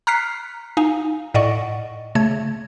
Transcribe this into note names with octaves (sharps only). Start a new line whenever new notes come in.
A#5 F6 F#6 B6 C7
D#4 F5 G#5
A2 D5 D#5 F#5 C#6
C#3 A3 G#6